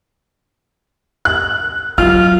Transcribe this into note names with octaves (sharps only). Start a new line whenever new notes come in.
F#6
F#3 F4 F6